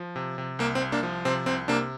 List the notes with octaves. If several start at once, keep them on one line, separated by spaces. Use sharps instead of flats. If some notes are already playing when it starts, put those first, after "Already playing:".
Already playing: F3
C3
C3
C2 A#3
C4
C2
A#3 D4
F3
C3 C4
C2 C4
C3 A#3 D4